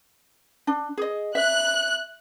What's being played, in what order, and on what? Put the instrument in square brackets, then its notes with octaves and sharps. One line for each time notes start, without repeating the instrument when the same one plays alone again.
[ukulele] D4
G#4 D#5
[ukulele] E5 [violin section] F#6